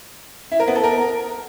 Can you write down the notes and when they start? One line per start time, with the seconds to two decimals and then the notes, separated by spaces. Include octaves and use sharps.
0.52 E4
0.60 A#4
0.68 B3
0.76 A4
0.84 A#4